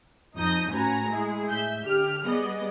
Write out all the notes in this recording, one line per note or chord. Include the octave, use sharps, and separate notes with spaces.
F2 D#4 D#6 G6 A#6
A2 C#4 F#4 B4 G#5 A#5
G#3 E4 G#4
A2 E5 G6
D3 G4 F6
G3 B3 G#4 D5 D#5